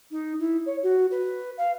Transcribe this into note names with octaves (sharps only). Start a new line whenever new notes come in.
D#4
E4
C#5
F#4
B4
F5